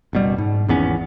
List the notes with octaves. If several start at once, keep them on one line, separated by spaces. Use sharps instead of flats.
F#1 B2 G3
G#2
G#1 E2 B3 C#4